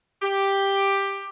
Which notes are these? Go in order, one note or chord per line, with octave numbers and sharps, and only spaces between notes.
G4